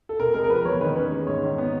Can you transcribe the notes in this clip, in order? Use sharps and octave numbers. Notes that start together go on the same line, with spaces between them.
A4
C3 A#4
G#3 A#4
A#4
F3 B4
E2 C#5
D#3 B4
C#4 B4
G#3
G#2 C#5
D#3
B3